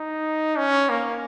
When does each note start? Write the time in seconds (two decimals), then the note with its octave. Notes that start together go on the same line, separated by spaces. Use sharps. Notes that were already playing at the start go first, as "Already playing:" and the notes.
Already playing: D#4
0.57 C#4
0.89 A#3